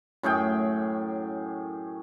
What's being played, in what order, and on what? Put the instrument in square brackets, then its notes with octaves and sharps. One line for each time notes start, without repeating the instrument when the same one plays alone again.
[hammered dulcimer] F#2 A2 G#4 G5